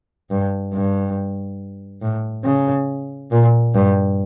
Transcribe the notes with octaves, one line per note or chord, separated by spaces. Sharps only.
G2
G2
A2
C#3
A#2
G2